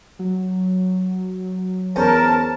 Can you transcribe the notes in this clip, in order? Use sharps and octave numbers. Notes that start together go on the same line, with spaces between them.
F#3
E2 C#4 A#4 C5 A5